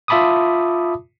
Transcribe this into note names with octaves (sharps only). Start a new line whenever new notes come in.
F4 E5 A5 B5 D6 D#6